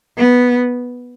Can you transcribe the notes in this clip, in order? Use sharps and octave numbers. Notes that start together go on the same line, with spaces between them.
B3